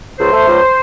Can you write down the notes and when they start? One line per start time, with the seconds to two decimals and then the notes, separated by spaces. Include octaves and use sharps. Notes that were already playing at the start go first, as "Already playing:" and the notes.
0.17 C#2 C5
0.31 A3
0.47 C#2